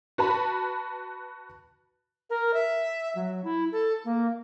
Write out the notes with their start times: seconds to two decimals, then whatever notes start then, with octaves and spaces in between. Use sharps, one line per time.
0.18 F#4 B4 A5 B5
2.30 A#4
2.54 E5
3.15 F#3
3.44 E4
3.72 A4
4.05 A#3